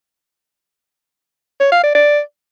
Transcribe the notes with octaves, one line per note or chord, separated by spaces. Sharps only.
C#5
F5
D5
D5